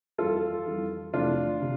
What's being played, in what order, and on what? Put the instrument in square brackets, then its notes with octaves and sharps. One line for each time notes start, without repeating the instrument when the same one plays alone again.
[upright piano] F2 E3 G3 [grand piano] F4 A4
[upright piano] F2 E3 G3
[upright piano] F2 C3 E3 A3 C4 [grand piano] D4 F4
[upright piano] C3